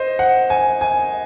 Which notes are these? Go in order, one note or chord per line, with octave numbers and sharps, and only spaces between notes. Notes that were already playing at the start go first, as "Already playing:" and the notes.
Already playing: C5 D#5
F#5
G#5
G#5